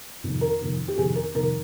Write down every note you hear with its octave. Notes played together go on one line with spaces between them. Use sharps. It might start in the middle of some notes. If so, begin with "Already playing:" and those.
F2 C3 D#3
A#4
F2 C3 D#3
G4
F2 C3 D#3 G#4
A#4
F2 C3 D#3 A#4